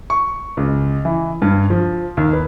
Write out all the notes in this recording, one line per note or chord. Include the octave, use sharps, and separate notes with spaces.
C#6
C#2
E3
G2
F3
D#2
B4